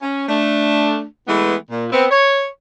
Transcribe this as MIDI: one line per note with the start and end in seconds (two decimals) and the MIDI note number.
0.02 0.23 61
0.28 1.04 57
0.28 1.04 62
1.28 1.55 52
1.28 1.55 56
1.28 1.55 57
1.28 1.55 59
1.71 1.86 46
1.91 2.06 59
1.91 2.06 60
2.10 2.46 73